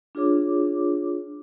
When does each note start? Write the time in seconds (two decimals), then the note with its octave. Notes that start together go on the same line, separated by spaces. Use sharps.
0.15 D4 F4 G#4 C#5 D6